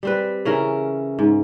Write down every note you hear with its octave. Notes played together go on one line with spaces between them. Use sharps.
G3 C4 B4
C#3 E3 C#4 A#4
G#2